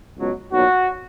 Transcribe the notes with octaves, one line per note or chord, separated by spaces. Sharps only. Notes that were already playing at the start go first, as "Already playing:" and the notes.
C#2 B2 F#3
B1 A#2 F#3 F#4